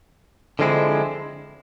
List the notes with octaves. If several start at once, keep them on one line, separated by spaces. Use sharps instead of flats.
D3 F3 G#3 C4 E4